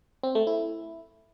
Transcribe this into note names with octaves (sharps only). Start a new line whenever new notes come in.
C4
A3
E4